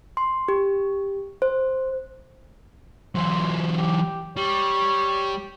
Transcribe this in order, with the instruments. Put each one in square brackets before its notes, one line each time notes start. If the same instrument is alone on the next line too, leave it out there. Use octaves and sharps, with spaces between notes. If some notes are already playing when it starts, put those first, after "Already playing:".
[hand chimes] C6
G4
C5
[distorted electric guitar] E3 F#3 [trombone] C5
[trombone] G4
[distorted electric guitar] G3 [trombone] C#5